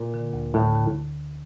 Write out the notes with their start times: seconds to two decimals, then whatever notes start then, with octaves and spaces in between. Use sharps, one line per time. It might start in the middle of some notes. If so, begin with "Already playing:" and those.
Already playing: A#2
0.14 D3
0.33 D2
0.54 A2 D3
0.75 D3